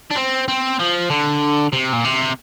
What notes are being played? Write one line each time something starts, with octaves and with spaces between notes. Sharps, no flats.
D4
C4
C4
F3
D3
C3
A#2
C3